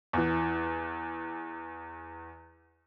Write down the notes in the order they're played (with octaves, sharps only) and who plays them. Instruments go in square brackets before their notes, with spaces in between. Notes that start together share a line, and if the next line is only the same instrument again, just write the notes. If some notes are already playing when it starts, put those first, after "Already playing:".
[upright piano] E2 E3